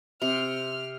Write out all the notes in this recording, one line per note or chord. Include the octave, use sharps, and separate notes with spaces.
C3 F6